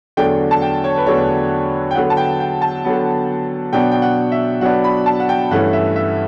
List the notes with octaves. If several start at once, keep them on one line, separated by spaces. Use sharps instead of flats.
E2 D3 F#3 A3 D4 G5
A5
G5
C#5
B4
E2 D3 F#3 A3 D4 C#5
G5
D3 F#3 B3 F#5
A5
G5
G5
A5
D3 F#3 B3
B2 F#3 B3 D4 G5
G5
F#5
E5
B2 F#3 B3 D4 F#5
B5
A5
F#5
G5
G2 E3 A3 C#4 F#5
E5
E5